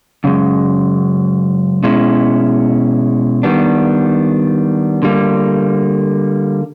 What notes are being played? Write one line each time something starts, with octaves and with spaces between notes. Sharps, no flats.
F#2 C#3 G#3
B2 G#3 C#4 E4
D#3 G3 B3 D4
D3 G3 A#3